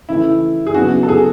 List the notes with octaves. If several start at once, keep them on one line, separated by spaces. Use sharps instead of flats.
C#3 E3 A3 E4
G#4
C#3 F#3 B3 D4 F#4
A4
G#4